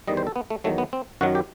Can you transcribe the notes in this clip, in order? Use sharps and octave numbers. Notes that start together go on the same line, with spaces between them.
E2 D#3 G3 D#5
C5
A4
B3
A3
E2 D#3 F#3 A3
B3
C4
F#2 D#3 F#3 F#4
G4